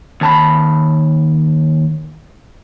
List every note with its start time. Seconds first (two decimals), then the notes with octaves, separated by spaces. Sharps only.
0.21 D#2 A5 B5